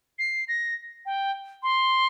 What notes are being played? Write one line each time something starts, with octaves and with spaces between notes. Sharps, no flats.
C7
A#6
G5
C6